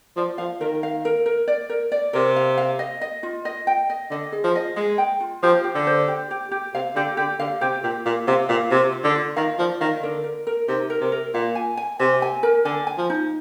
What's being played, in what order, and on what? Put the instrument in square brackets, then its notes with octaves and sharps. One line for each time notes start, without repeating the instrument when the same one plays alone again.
[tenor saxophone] F3 [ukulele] D5
[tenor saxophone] F3 [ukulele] F5
[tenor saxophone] D#3 [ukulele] A#4
[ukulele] F5
A#4
A#4
D5
A#4
D5
[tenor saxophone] C3 [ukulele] A#4
[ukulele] F5
F5
D#5
D#5
F4
D#5
G5
D#5
[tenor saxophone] D3 [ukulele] D#5
[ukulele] G#4
[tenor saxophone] F3
[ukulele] D#5
[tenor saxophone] G#3 [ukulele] G#4
[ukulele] G5
F4
[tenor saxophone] F3 [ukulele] G4
[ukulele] G4
[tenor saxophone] D3
[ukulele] C5
G4
G4
G4
[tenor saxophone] C3 [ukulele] F5
[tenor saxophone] D3 [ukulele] G4
[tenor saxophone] D3 [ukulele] G4
[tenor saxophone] D3 [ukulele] F5
[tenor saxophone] C3 [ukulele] G4
[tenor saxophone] A#2 [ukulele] G4
[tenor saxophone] A#2 [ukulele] F5
[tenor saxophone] C3 [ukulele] F5
[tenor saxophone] A#2 [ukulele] F5
[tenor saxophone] C3 [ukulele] F4
[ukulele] F4
[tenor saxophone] D3
[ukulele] F4
[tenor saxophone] D#3 [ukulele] F5
[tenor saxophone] F3 [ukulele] D5
[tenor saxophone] D#3 [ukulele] F5
[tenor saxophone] D3 [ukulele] A#4
[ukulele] A#4
A#4
[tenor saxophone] C3 [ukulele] D#4
[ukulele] A#4
[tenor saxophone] C3
[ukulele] A#4
[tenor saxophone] A#2 [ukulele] F5
[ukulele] G#5
G#5
[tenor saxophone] C3 [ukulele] G#5
[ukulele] G#5
A#4
[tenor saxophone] D3 [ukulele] G#5
[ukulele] G#5
[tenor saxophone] F3
[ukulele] D#4